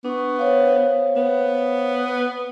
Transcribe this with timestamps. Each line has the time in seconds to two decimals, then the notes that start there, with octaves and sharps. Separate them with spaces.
0.05 B3 D4 C#6
0.39 C5 C#5 F5
1.16 B3